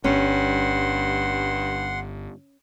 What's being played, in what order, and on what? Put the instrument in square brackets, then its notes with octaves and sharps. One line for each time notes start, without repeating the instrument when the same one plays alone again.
[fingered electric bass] G1 [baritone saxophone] G2 [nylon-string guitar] C#4 [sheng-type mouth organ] F#5 C6